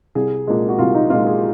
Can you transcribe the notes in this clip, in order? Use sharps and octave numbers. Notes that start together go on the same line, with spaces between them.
C2 G#4
A#2 G#3
F#4
C2 F4
D#4
A#2 G#3 F4
G#4